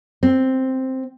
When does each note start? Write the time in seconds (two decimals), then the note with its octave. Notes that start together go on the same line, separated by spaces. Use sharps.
0.23 C4